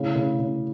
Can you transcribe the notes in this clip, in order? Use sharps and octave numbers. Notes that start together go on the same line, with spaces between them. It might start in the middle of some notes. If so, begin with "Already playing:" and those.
Already playing: A2 C#3
C#3
C#3